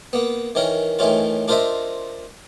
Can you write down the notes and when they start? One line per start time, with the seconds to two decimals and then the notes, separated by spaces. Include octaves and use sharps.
0.13 A#3 B3
0.55 D#3 E3 C#4 A#4
0.99 A2 D#3 E3 C#4 F4
1.48 D4 F4 A#4 C5 D#5 E5